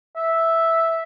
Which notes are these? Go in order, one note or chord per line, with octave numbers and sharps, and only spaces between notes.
E5